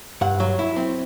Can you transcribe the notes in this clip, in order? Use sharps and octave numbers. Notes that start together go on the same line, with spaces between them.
G2 F#5
F#3
E4
C4